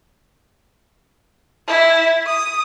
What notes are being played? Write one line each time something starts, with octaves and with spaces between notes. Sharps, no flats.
E4
D#6